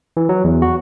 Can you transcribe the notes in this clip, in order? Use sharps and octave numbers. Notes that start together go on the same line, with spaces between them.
E3
F#3
E2
F#4